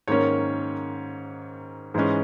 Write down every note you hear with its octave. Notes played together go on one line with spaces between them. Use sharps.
G#2 D#3 A#3 C#4 C#5
G#2 E3 G#3 C#4